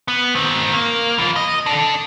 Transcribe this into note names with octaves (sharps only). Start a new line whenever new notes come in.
B3
D#3 C4
A#3
E3 F4
D#5
D4 A4